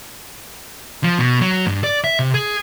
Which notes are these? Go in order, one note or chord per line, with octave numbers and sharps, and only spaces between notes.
F3
B2
F#3
G2
D5
E5
C3
G#4